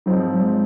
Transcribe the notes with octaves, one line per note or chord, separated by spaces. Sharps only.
G#2 F3 F#3 C4 D#4
F#3
G#3